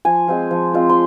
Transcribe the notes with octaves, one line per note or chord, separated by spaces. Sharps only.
F3 G#5
G#3 C4 F4
F3
G#3 C4 F4
C6